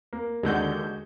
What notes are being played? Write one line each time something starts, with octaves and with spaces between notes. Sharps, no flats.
A#3
D#2 D3 G#3 F#4 G6